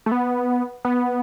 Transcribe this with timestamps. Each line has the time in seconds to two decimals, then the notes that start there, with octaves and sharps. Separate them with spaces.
0.06 A3
0.12 B3
0.85 B3